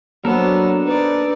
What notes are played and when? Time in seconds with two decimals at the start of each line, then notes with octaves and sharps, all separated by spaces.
0.25 F#3 A#3 B3 D4 A4 A#4 C5
0.86 D#4 B4 D5